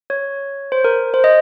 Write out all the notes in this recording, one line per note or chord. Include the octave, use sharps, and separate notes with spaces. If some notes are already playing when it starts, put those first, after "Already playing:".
C#5
C5
A#4
C5
D#5